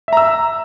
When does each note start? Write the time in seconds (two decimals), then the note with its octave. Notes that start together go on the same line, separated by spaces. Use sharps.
0.08 E5
0.13 A#5
0.17 E6